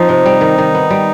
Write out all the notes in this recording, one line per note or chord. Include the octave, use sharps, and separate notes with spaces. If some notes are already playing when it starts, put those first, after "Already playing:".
Already playing: F3 C4 D#4
C3
G3
D#3
D#3
B3
G3